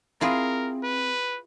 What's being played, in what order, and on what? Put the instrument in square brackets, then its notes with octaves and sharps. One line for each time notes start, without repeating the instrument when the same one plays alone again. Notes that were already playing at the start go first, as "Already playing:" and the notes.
[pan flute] C4 [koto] E4 F4 G#4 [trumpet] A#4
[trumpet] B4